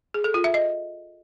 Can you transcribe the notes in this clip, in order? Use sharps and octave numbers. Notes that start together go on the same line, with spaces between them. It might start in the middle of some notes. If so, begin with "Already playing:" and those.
G#4
A4
F4
E5
D#5